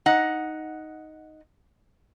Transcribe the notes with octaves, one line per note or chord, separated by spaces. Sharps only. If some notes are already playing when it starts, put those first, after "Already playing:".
D#4 F#5